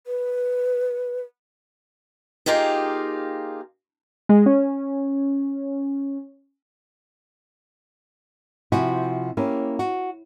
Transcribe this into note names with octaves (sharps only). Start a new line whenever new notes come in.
B4
A#3 D#4 F4 G4 G#4
G#3
C#4
C3 F3 E4 F#4 G#5
A#3 C#4 E4 G4
F#4